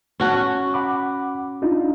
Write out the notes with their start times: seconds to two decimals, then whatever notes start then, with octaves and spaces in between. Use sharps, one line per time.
0.20 C#4 F#4 A5 C#6
0.74 F#5 B5 D6
1.62 D4 D#4 F4